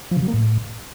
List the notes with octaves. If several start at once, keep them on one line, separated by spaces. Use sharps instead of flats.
F3
C#3
F#3
A#3
A2